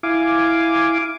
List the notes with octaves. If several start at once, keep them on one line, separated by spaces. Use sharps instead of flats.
E4 F5 G#5 D6